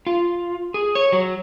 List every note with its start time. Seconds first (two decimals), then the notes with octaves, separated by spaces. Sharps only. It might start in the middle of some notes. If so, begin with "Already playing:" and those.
0.07 F4
0.74 G#4
0.95 C#5
1.12 F#3